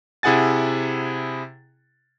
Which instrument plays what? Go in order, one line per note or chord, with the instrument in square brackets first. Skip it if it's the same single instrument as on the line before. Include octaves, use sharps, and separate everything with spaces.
[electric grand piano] C3 E4 G#4 F#5 G#5 A6